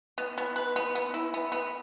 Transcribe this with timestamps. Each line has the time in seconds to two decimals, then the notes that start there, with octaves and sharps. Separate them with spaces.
0.18 B3
0.38 B3
0.56 B4
0.76 B3
0.95 B3
1.14 E4
1.34 B3
1.52 B3